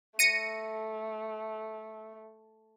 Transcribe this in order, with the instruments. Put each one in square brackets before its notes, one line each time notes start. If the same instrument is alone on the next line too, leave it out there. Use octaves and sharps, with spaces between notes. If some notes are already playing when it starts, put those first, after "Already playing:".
[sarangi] A3 [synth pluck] A#6 C#7 D#7